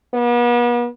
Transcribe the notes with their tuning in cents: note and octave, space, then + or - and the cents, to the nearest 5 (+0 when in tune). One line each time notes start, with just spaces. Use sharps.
B3 -40